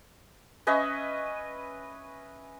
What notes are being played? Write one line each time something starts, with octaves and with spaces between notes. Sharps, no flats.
C#4 B4 D#5 E5